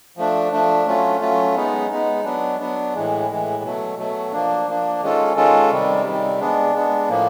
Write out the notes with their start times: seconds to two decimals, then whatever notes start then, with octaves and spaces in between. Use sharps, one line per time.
0.17 F3 A3 D4
0.52 F3 A3 D4
0.87 F#3 A3 C#4 F4
1.21 F#3 A3 C#4 F4
1.56 G#3 B3 D#4
1.90 G#3 B3 D#4
2.24 F#3 B3 D4
2.59 F#3 B3 D4
2.94 A2 E3 G#3
3.29 A2 E3 G#3
3.63 B2 F#3 A3
3.97 B2 F#3 A3
4.32 F3 A#3 D4
4.67 F3 A#3 D4
5.02 D#3 G#3 C#4 F4 A4
5.36 D#3 G#3 C#4 F4 A4
5.71 C3 D#3 G3
6.05 C3 D#3 G3
6.40 G#3 B3 D4
6.74 G#3 B3 D4
7.09 A2 F3 A#3